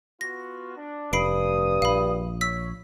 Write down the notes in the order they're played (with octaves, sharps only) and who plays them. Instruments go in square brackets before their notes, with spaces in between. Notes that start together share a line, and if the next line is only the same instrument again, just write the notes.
[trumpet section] B3 F4 F#4 [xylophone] A#6
[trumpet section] D4
[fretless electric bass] F1 [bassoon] G2 [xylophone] B5 C7 D7 [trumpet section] D#6
[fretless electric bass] A#1 [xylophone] F5 B5
[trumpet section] C#5 [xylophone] E6 B6